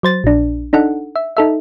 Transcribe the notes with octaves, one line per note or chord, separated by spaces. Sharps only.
F#3 C5 A6
A#1 D4
D4 D#4 A4 F#5
E5
D#4 A4 E5